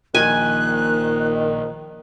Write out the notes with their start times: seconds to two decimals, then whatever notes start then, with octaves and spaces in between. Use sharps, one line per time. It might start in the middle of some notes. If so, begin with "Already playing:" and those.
0.15 A#1 A#2 D#3 G#5 F#6